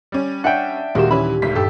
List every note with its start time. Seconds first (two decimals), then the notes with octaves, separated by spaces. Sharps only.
0.12 G3 C#4
0.44 D4 E5 F#5 G5
0.95 D#1 G#3 A#3 F#4 G4 E7
1.11 E3 C#4 E4 B5
1.42 G#1 D2 B6
1.55 G2 G4 A4